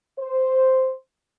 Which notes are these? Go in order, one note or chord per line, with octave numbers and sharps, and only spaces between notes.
C5